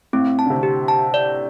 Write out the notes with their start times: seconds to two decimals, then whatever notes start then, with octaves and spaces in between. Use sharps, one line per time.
0.13 A2 C4
0.39 A5
0.46 D3
0.50 C3
0.63 G4
0.88 A5
1.14 D5